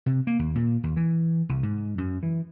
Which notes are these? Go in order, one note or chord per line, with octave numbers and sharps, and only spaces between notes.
C3
A#3
D#2
A#2
D#2
E3
C2
G#2
F#2
E3